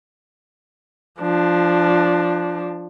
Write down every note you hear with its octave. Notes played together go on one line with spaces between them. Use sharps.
F3 D4